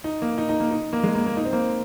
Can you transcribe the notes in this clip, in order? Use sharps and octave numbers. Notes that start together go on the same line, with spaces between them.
D#4
A#3
D#4
D#4
A#3
D#4
A#3
G#3
A#3
A#3
D#4
C4
A#3